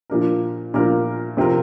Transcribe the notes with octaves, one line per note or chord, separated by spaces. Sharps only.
A#2 F3 D4 A#4
A#2 F3 D4 A#4
C3 F3 C4 F4 A#4